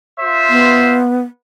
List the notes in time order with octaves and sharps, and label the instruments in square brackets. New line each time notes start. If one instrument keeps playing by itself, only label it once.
[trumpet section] F4 C5 E5
[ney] B3